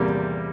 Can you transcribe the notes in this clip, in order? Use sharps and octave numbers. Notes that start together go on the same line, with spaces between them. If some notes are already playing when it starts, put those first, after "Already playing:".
Already playing: E2 C3 G3 A#3